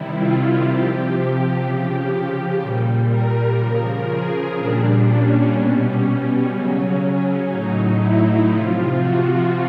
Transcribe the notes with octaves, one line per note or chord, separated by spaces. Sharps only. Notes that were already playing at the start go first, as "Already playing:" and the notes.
Already playing: C3 D#3 G3 E4
F4
C3 F3 G4
C#3 F3 G4
A#2 G3
A#4
C#3 F3
G#4
A#2 G3 D4
C#4
B2 G3
C#4
C#3 F#3
A2 F#3 D#4
E4
C3 F3 F4
F#4